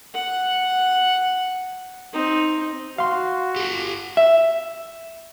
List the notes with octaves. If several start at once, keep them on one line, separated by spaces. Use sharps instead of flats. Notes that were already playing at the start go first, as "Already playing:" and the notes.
F#5
C4 D#4
F#4 F5 C6
G4 A4
E5